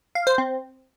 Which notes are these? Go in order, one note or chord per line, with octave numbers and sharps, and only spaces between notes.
F5
C5
C4